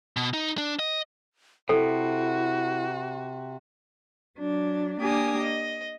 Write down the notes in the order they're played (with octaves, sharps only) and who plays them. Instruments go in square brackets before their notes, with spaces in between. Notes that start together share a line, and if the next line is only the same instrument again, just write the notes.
[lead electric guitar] B2
D#4
D4
D#5
[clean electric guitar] C3 [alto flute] E4 [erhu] F#4 [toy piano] A4
[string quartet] F#3 D4
A#3 D4 G4 G#5 D#6
D#5